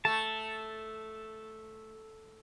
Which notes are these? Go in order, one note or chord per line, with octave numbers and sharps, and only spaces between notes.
A3 A5